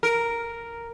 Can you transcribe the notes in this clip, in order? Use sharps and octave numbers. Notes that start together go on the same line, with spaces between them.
A#4